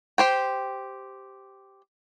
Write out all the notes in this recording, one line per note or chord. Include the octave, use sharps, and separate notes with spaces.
G4 C5 G5